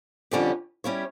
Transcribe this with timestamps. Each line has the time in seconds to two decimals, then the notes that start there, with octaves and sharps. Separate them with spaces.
0.31 F2 D3 G3 C#4 G4
0.84 G3 C#4 E4 G4 C#5